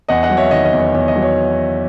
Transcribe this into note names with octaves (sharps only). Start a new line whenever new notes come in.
E2 D#5 F#5
D#5 F#5
F#3
C#5 E5
D#3 D#5
D#5
E2
C#5
E2 C#5
D#5
F#3
C#5